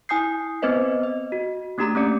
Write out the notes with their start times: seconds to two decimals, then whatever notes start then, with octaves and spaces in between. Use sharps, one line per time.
0.09 E4 G#5 D#6 G6 C7
0.62 B3 C4 B4 C5 D#5 B6
1.03 D#5
1.32 F#4
1.78 A3 A#3 D4 G4 A#5
1.95 A3 C#4 D5 C#7